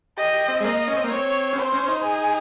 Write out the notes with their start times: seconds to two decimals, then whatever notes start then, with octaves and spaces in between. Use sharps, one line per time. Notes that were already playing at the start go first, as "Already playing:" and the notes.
0.18 G4 D#5
0.34 G4
0.48 C4
0.60 G#3
0.64 A#3 D#5
0.88 C#4
0.96 C4
1.04 A#3
1.11 C4 C#5
1.53 C#4
1.57 C4 C5
1.72 C#4
1.83 C#4
1.88 D#4
2.04 G#4